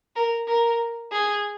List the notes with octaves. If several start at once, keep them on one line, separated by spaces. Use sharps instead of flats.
A#4
A#4
G#4